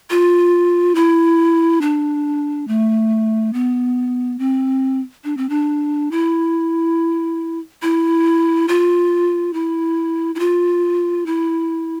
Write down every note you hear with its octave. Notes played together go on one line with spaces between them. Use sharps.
F4
E4
D4
A3
B3
C4
D4
C4
D4
E4
E4
F4
E4
E4
F4
E4